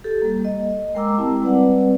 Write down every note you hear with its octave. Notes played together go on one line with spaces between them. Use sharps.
G4 A4
G3 A#3
D#5
G#3 A#4 G5 A#5 D6 E6
C4 E4 G4 A5
G3 C4 B4 D5 F#5